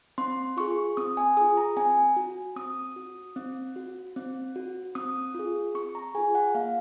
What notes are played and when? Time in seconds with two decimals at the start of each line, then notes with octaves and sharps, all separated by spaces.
0.18 C4 C6
0.57 F4 G#4 C#6
0.97 C4 D#6
1.17 G#5
1.37 G#4 D#6
1.41 F4
1.57 A#5
1.77 C4 G#5
2.16 F#4
2.56 C4 D#6
2.96 F#4
3.36 C4
3.76 F#4
4.16 C4
4.56 F#4
4.95 C4 D#6
5.35 F4 G#4
5.74 C4 C#6
5.95 A#5
6.15 G#4 G#5
6.18 F4
6.35 F#5
6.55 A#3 F5